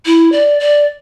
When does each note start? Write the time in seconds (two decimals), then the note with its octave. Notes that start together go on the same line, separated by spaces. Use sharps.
0.06 E4
0.32 D5
0.60 D5